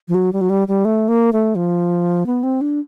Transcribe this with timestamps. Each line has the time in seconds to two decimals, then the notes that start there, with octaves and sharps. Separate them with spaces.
0.08 F3
0.15 F#3
0.33 G3
0.41 F#3
0.50 G3
0.68 G3
0.85 A3
1.08 A#3
1.33 A3
1.55 F3
2.26 B3
2.43 C4
2.61 D4